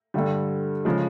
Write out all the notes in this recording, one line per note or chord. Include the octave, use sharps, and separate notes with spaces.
G2 D3 G3
C#3 F3 G#3